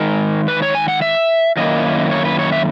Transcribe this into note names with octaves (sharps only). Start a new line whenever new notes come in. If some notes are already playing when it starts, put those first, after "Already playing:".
Already playing: D#3 G#3 D#4 A#4
B4
C#5
G#5
F#5
E5
F#2 D#3 A#3 E4 D#5
C#5
B4
C#5
E5